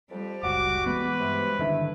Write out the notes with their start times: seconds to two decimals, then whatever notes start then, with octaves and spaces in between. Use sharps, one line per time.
0.11 F2 G3
0.43 F#1 C#2 F#4 D6
0.86 E3 G#3 B3 B4
1.19 G2 C3
1.59 D3 D#3 D4 E4